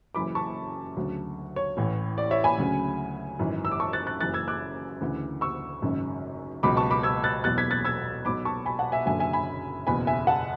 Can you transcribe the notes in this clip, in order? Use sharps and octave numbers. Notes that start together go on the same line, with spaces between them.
F#1 F#2 E3 B5 D6
A5 C#6
D2 C#3 F#3
C#5
A1 A2 E3
D5
C#5 E5
G#5 B5
D2 C#3 F#3
G#1 F#2 E3
E6
D6
A5 C#6
F#6 A6
F#6 A6
F#1 F#2 E3 F#6 A6
E6 G#6
D6 F#6
D2 C#3 E3
C#6 E6
G#1 F#2 C#3
C#2 B2 F#3 B5 D6
A5 C#6
B5 D6
E6 G#6
F#6 A6
E2 B2 F#3 F#6 A6
G#6 B6
F#6 A6
E6 G#6
B1 B2 F#3 B5 D6
A5 C#6
G#5 B5
F#5 A5
E5 G#5
F#1 F#2 D3 F#3 E5 G#5
E5 G#5
G#5 B5
F#1 E2 B2 G#5 B5
E5 G#5
F#5 A5